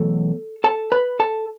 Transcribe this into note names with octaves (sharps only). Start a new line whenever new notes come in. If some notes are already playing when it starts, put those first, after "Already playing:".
Already playing: E2 B2 F#3 A3 A4
A4 A5
B4 B5
A4 A5